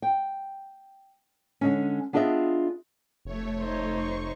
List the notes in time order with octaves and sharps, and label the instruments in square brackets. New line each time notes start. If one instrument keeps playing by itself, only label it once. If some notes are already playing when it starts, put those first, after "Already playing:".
[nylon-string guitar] G5
D3 G#3 C#4
B3 D4 F4 G#4 D#5 E5
[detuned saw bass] F1 [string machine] A3 C#5
[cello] D#4 C5
[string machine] C#6